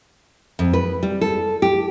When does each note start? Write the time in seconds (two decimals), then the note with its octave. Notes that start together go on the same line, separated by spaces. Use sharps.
0.59 F2
0.73 B4
1.03 G3
1.21 A4
1.62 G4